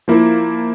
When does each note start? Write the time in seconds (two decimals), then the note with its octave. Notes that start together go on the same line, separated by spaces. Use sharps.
0.08 F3 A#3 E4